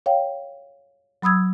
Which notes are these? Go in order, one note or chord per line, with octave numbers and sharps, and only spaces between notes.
C#5 F5 G5
F#3 B5 D#6 E6 G#6